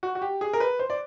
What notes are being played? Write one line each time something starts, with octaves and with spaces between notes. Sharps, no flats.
F#4
F#4
G4
G#4
A#4
B4
C5
D5